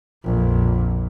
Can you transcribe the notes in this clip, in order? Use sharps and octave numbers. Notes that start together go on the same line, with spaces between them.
A#1 F2